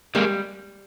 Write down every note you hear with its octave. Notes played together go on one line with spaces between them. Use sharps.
G3 G#3 A#3